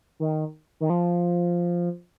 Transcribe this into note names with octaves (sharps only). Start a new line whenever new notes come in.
D#3
D#3
F3